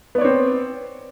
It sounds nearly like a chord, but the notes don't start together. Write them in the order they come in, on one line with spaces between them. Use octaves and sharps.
B3 D5 C#5 C4